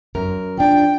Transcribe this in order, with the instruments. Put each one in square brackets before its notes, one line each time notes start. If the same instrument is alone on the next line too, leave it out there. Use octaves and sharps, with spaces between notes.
[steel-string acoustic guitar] F#2 A#4
[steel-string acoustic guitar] F3 D4 [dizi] G5